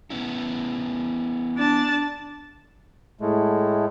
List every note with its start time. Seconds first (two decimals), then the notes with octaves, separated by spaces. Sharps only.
0.10 B3 C#4 E4
1.57 D4 A5
3.21 A2 G#3 A3